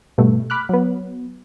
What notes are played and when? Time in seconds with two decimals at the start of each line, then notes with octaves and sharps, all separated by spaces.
0.18 G2 B2 A3
0.50 B5 D6 F6 F#6
0.69 F#3 B3